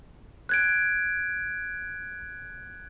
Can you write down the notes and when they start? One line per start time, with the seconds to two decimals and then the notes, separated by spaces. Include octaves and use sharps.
0.49 F#6 G#6 D7